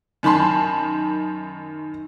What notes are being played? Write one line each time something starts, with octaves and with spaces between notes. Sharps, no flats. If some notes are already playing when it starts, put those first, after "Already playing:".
F#2 D#3 A5 B5 C6